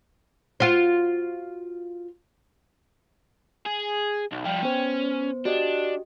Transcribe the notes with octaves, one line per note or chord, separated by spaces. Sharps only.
F4 F#4 C5
G#4
B1
F3 G3 G5
B3 C#4 C5
D4 F#4 G4 D#5